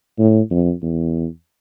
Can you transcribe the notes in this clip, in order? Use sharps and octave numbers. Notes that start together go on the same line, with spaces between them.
A2
F2
E2